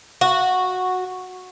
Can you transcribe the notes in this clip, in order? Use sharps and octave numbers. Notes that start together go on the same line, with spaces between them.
F#4